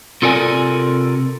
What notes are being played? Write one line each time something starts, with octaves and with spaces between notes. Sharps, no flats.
C3 F4 A4 A#4 D5 G#5